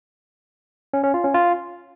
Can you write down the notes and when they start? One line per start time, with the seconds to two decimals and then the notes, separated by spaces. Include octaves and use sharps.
0.93 C#4
1.04 C#4
1.14 F4
1.24 C#4
1.34 F4